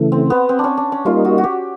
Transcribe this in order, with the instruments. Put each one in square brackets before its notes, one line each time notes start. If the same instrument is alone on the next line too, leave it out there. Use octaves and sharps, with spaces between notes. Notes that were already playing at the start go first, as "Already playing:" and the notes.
Already playing: [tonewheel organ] C#3 E3 A3
[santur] C4
B3
C4
C#4 D4
D4
C#4
[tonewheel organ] G3 A#3 D#4 [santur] F4
[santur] F#4
F#4
G4